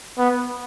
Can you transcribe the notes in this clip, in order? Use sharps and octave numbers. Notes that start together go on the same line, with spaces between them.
B3